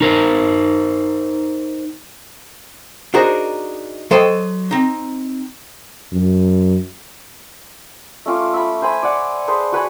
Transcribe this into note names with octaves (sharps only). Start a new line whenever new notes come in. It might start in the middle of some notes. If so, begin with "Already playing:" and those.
D#4 A#4 C5
D4 D#4 F#4 G#4 A#4 C5
F#3 A4 C5 D#5 G5 B5
C4 D#4
F#2
A3 C#4 F4 D6
E5 B5
C5 G#5 B5
D5 F#5
G#4 B4 C5 A5
F#4 B4 C#5 G#5